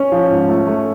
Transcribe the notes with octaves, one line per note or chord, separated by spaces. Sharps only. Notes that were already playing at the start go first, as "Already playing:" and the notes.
Already playing: C#4
F3
G#2
A3
A3